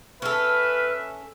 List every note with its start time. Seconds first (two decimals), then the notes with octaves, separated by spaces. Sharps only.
0.22 C#4 A4 B4 E5 F6